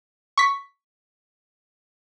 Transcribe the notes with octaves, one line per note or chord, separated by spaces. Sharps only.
C#6 B6